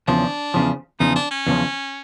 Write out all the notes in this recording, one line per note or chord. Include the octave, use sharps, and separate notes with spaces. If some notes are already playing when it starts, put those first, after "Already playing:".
E2 C#3 F3 D4
E2 C#3 F3
E2 C#3 F3 D#4
D4
C#4
E2 C#3 F3